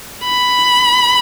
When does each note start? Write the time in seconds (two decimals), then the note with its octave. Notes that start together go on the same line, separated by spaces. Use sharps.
0.24 B5